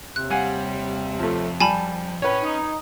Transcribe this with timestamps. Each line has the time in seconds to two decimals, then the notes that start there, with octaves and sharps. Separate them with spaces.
0.16 D#2 C3 C4 F#6
0.30 G3 F5 F#5 G#5
1.19 F2 F3 A3
1.60 G3 G#5 A5 B5
2.22 A2 C#4 B4 C#5
2.43 D#4